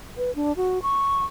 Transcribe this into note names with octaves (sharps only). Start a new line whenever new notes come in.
B4
D4
F#4
C#6